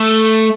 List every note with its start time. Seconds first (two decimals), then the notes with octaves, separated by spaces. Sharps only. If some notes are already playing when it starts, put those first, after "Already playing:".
Already playing: A3